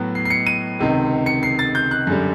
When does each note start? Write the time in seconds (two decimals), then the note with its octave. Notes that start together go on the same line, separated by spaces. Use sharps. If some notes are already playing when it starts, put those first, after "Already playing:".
Already playing: A2 F#3 B3
0.15 C7
0.25 C7
0.30 C#7
0.46 D#7
0.79 C#2 C3 D#3
1.26 C#7
1.43 C7
1.59 A6
1.75 G6
1.91 F#6
2.07 F#2 D3 G3